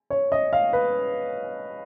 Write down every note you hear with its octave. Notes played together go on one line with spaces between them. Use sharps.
C#5
D#5
F5
B4